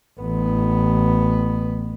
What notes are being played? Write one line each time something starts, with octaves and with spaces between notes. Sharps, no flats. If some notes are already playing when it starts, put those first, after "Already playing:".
A1 B3